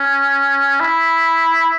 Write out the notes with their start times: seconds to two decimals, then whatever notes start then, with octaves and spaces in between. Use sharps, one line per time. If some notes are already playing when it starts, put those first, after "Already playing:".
Already playing: C#4
0.80 E4